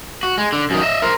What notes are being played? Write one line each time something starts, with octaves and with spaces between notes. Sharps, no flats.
F#4
G#3
D3
F#2 D#3
D#5 E5
A#4 C5